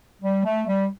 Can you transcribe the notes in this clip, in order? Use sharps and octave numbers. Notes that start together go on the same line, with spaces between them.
G3
A3
G3